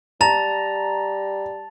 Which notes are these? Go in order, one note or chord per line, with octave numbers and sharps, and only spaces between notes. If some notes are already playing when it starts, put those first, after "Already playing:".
G3 A5 A#5 A6 F7